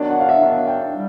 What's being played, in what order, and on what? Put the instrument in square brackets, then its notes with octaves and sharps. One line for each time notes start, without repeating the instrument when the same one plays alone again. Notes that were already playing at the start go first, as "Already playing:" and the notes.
Already playing: [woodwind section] D#3 F#3 B3 D4 [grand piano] D5
[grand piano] F#5
F5
E5
[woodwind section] D#3 F#3 B3 D4 [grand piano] F5
[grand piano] G5
[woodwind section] G3